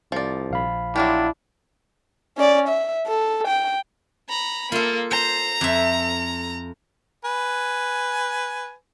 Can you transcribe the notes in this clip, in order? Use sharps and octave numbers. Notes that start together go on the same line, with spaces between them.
C2 F3 D5
A#1 F5 B5
F#3 D4 E4 F4 G4
C#4 D5
E5
A4
G5
A#5 B5
A#3 F4 A4
C5 A#5
F2 E5
B4 G#5